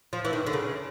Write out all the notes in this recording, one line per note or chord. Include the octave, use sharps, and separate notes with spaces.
F3
E3
D#3
D3
C#3